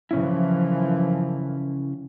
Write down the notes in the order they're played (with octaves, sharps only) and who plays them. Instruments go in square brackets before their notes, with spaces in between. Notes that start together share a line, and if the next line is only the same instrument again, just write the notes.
[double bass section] F#2 E3 F3 [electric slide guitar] C#3 C#4 E4